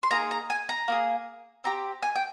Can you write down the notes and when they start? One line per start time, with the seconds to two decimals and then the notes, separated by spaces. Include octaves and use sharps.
0.03 C6
0.11 A#3 D#4 G#4 A#5
0.31 A#5
0.50 G#5
0.69 A#5
0.88 A#3 D#4 G#4
1.64 C4 G4 A#5
2.03 G#5
2.16 G5